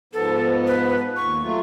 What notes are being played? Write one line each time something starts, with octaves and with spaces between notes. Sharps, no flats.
G#2 F3 B3 A4
B4
D#2 C#6
F#3 A3 F4